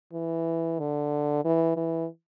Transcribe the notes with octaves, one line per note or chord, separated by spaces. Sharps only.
E3
D3
E3
E3